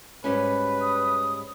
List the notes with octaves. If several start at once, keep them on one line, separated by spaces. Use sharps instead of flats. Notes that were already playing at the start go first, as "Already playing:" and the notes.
G#2 G3 C#4 B4
D#6